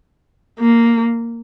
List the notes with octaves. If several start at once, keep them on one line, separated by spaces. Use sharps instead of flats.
A#3